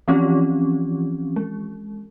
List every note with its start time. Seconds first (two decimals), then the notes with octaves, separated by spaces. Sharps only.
0.08 E3 F3 C4 C#4 F4 G4
1.36 G#3